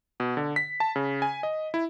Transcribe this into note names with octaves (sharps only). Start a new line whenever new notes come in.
B2
D3
B6
A5
C#3
G#5
D#5
E4